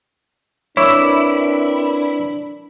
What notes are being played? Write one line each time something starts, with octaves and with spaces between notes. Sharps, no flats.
C4 D4 E4 A#4 B4 C#5 D6 E6